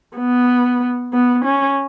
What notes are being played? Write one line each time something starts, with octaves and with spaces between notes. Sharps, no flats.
B3
B3
C#4